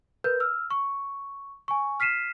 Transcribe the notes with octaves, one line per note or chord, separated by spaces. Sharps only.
A#4 B4 G6
E6 F6
C#6
G#5 C#6
F6 B6 C7 D#7 E7